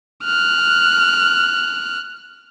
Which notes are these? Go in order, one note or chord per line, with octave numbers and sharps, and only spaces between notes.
F6 F#6